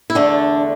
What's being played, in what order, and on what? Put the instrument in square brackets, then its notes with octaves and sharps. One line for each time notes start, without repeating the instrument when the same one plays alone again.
[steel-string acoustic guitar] E4
E2 D3 A3 D4